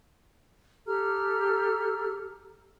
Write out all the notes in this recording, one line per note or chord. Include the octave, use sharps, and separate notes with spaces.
G4 A4 A#5 F6